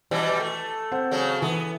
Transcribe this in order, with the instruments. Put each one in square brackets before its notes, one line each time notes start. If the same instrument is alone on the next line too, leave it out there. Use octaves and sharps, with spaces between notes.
[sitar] B2 E3 G3
A3
[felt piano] C4 C5 F#5
[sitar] C#3 F#3 A3
[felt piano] E3 [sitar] B3